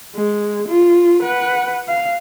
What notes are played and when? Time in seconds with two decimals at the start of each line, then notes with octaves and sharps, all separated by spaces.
0.15 G#3
0.68 F4
1.22 B4 F#5
1.89 F5